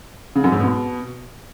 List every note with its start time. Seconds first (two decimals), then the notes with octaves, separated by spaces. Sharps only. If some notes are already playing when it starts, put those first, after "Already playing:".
0.36 C#3
0.44 F#2
0.52 G#2
0.60 B2